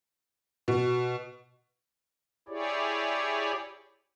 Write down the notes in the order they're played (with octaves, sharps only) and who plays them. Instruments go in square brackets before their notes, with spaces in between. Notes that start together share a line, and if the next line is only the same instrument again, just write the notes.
[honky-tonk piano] B2
[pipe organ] E4 G4 G#4 C#5 D5